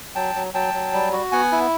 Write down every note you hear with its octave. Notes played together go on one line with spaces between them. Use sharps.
F#3 G5 A5
F#3
F#3 G5 A5
F#3
G3
F#4
B3 F#5 G#5
E4